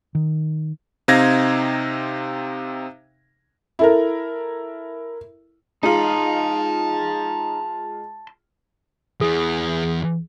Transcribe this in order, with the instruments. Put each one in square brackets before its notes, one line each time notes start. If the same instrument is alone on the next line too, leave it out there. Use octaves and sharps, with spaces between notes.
[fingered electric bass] D#3
[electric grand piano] C3 C4 D#4 F5 G#6 A#6
[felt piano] E4 A4 A#4
[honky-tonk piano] G#3 F4 [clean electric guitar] D#4 [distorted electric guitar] A5 C6
[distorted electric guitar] E2 E3 [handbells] G#4